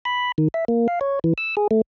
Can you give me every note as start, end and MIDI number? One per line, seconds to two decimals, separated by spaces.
0.05 0.32 83
0.38 0.48 51
0.54 0.65 76
0.68 0.87 58
0.88 0.99 77
1.01 1.19 73
1.24 1.33 52
1.38 1.55 88
1.57 1.68 68
1.71 1.81 57